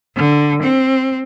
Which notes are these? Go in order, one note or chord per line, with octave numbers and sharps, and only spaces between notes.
D3
C4